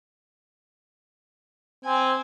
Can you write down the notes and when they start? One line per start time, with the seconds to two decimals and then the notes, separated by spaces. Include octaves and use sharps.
1.85 C4 G#5